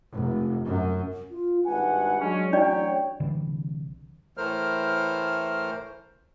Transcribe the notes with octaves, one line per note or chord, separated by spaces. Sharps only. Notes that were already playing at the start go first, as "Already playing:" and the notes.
F1
F#2
F4
G#1 G2 F#5 G#5
F#3 G#3 C#4 D4
A1 F#3 C#4 D4 C#5 D5 G5
C2 D3 E3
A2 E3 A3 A#4 C5 F6